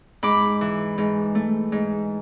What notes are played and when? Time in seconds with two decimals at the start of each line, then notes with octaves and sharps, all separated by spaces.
0.23 G#2 B5 D6
0.61 E3
0.98 G#2
1.35 A3
1.72 G#2